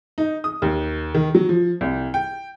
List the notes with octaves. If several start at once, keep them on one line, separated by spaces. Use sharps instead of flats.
D#4
D#6
D#2
D#3
F#3
F3
C2
G5